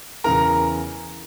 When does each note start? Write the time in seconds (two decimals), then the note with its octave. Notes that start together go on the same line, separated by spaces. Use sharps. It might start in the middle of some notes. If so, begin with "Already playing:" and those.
0.24 E2 C#3 E3 A#4 A#5